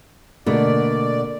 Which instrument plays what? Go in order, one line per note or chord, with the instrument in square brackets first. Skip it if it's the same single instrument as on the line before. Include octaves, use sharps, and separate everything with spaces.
[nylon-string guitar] B2 A3 [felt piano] D3 A#3 [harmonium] D5